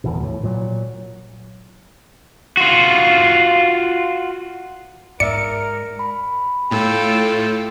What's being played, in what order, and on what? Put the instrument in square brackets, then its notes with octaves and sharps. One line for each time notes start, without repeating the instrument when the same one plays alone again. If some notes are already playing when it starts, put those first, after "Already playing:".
[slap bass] D1 E2 B2
A2
A#2 F#3
[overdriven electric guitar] F4 F#4
[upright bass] G#2 [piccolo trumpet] A#4 [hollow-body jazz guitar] D5 E5 [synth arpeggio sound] C#7
[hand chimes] B5
[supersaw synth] A2 [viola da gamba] F4 A4 [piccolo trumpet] G5